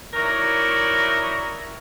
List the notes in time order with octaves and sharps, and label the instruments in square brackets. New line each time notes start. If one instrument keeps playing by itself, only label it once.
[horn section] D#4 E4 F#4 A#4 C#5 D5